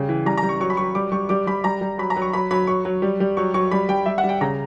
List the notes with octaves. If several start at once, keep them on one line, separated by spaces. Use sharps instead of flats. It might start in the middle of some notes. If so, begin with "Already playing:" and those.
Already playing: C#3 G3 G5
E3
G3 A#5
A#5
G3
C#6
F#3 C#6
B5
F#3 C#6
G3 D6
G3 C#6
G3 D6
G3 B5
G3 A#5
G3
F#3 B5
A#5
F#3
C#6
F#3 B5
F#3 B5
F#3 C#6
F#3
G3
G3
F#3 C#6
F#3 C#6
G3 B5
G3 G5
G3 E5
F#5
G3
G5
C#3 A#5